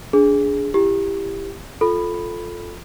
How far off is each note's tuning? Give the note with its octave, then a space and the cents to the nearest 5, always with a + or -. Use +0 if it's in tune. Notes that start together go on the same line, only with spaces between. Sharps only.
D4 -20 G#4 +0
E4 +25 G4 +15
F4 +10 A4 -5 B5 +0